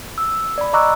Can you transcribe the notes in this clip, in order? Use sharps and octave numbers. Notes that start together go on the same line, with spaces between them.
E6
D5 B5
D#5 A#5 C#6 D6 E6 F#6